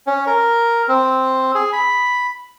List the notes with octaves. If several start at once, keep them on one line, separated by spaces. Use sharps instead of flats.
C#4
A#4
C4
G#4
B5